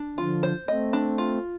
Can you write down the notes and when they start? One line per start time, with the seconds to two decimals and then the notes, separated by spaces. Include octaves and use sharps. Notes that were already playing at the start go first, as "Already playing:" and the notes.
Already playing: D4
0.17 D3 F3 F4
0.43 C5
0.68 A3 C4 D#5
0.93 D4
1.18 F4